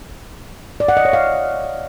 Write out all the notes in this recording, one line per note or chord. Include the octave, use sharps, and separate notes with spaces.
D5
F#5
D#5
C#5
F5